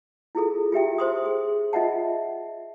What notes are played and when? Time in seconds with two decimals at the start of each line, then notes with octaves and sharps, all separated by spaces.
0.35 E4 F4 G#4 A4
0.72 F4 G4 E5 G5
0.98 C5 C6 D#6
1.26 G#4
1.73 F4 D#5 E5 F#5 A5